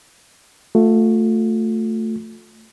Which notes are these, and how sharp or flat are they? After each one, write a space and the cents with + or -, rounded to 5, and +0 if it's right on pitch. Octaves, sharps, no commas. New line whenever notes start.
A3 +10 F4 +40